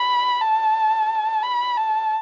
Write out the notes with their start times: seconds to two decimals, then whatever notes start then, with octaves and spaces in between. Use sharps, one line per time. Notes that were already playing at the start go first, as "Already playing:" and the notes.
Already playing: B5
0.40 A5
1.43 B5
1.77 A5